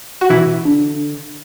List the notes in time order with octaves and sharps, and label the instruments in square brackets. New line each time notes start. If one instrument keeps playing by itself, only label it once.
[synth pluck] F#4
[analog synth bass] B2 [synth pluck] E3 E4
[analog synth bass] D3